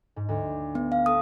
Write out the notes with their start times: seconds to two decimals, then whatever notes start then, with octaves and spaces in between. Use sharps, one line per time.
0.16 G#2
0.29 D2
0.75 B3
0.92 F5
1.06 A4 D#6